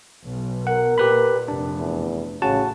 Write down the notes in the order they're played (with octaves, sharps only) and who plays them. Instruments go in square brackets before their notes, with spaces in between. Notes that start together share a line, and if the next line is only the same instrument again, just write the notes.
[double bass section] B1
[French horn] A#4 [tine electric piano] F#5
[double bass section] A#2 [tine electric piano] G4 B4 B5
[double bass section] F1 [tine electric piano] D4
[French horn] E2
[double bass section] A1 [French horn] C#3 [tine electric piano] F#4 F#5 A5